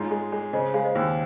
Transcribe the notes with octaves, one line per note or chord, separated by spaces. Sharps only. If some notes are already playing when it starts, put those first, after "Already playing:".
Already playing: G#2 F4 C#5
G#3
G#3
C#3 C5 D#5
G#3 F5
C5 D#5
D#2